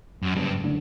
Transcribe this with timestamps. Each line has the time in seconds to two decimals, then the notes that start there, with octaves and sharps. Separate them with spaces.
0.23 F#2
0.36 F#1 G2
0.64 D3 A3